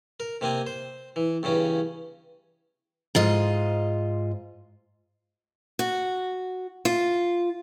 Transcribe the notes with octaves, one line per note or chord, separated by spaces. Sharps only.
A#4
C3 A#3 C4 G#5
C5
E3
E2 G2 C#3 C#4
G#2 F4 D#5
F#4
F4